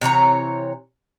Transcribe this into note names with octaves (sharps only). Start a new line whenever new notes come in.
C3 E3 C#5 A#5